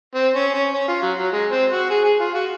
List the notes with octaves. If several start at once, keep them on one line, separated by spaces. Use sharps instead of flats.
C4
C#4
C#4
C#4
F4
F#3
F#3
G#3
C4
F#4
G#4
G#4
F4
F#4